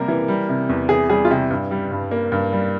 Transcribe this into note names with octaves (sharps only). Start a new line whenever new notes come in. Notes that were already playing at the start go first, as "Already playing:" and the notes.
Already playing: C3 G3 A#3 A#4
E3
G3
C3
E2
E3 G#4
G3 G#4
F4
C3 G4
G2
G3
G2
A#3
G2
G3